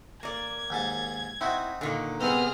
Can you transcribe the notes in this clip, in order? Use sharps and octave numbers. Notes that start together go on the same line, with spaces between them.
A#3 D5 G#6
D#2 G#2 A5
C4 D#4 E4 F#4
A#2 D3 D#3 A#3
C2 B3 C4 G#4 D#5 F6